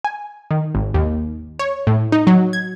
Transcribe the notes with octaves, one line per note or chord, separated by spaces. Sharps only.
G#5
D#3
G#1
D#2
C#5
A2
D#4
F#3
G#6